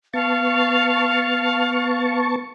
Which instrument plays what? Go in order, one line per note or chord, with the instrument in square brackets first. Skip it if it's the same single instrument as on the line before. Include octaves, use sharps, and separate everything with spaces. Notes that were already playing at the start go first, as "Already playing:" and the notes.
[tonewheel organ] B3 A5 C#6 [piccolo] F5